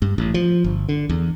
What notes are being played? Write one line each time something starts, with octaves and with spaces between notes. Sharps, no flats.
G2
A1
F3
G1
D3
E2